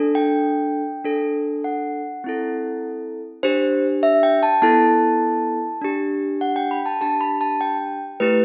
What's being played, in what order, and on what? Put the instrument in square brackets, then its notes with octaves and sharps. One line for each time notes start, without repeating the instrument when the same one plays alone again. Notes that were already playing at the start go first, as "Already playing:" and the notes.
Already playing: [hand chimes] D4 A4
G5
D4 A4
F#5
C4 E4 A4
D4 G4 C5
E5
G5
A5
B3 E4 A4 A5
D4 G4
F#5
G5
B5
A5
D4 G4 A5
B5
A5
G5
A3 E4 G4 B4